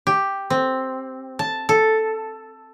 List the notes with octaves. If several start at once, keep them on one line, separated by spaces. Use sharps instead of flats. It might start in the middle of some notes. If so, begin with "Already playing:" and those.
G4
C4
A5
A4